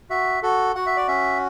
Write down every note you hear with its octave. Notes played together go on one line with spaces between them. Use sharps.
F#4 E5
F#4 A4
F#4 F#5
E5
D5
C#4 E5